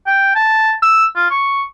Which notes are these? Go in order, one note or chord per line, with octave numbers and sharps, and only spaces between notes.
G5
A5
E6
F4
C#6